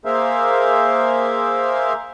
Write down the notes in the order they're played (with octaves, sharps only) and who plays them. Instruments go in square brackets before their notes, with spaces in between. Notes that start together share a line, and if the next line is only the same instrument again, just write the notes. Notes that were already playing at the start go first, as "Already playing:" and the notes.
[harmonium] A#3 G#4 A#4 C5 E5 F5